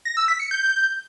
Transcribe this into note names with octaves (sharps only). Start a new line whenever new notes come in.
A#6
E6
B6
C#7
G6